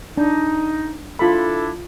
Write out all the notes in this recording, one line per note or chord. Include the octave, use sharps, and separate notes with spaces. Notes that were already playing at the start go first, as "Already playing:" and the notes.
D4 D#4
D4 E4 F4 A4 B5